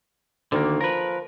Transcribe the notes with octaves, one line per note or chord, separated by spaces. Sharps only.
D2 D3 D#3 A#3
F3 A#4 B4